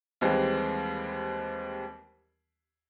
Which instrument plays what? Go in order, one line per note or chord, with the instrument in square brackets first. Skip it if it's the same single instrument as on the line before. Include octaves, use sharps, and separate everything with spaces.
[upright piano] D#2 E3 G3 G#3 C4